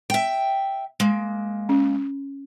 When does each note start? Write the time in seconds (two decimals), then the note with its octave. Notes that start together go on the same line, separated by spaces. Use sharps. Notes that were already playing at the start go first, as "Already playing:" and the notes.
0.10 E5 G5
1.00 G#3 A#3
1.69 C#4